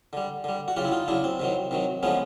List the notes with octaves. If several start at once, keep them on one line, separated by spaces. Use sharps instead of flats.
D3 G3
D3 G3
F#4
C#3 F#3 F4 G4
E4
D#4 F4
C#3 F#3 D4 E4
C4
C3 D#3 F#3
C3 D#3 F#3
D3 F3 G#3 B3 C#4